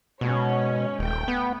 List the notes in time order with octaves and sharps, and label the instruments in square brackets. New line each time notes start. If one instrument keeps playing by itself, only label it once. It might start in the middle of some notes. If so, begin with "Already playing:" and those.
[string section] G#2 C#4 C#5 [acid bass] B2
[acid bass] D#1 [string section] A3 G5
[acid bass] B3